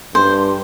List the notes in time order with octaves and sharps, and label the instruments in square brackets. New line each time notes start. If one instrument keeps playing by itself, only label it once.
[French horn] G2 [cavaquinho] C5